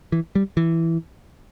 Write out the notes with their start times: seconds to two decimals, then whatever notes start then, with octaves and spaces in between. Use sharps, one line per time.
0.12 E3
0.35 G3
0.57 E3